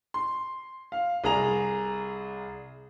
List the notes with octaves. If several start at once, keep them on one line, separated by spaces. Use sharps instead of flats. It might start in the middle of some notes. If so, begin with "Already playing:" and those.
C6
F5
C2 G#4 A#5 F7